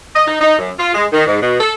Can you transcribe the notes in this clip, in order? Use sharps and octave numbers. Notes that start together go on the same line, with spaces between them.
D#5
D#4
D#4
F#2
F4
G#3
D#3
G#2
B2
A4